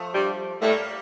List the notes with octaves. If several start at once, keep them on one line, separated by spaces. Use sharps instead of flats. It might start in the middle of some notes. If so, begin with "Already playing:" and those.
Already playing: F3 A3
G2 G3
A2 G3 A3 A#3